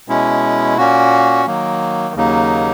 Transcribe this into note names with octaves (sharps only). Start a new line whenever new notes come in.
B2 G#3 C#4 E4
A#2 A#3 C#4 F#4
D#3 F#3 A#3
D#2 C#3 F#3 A#3 D#4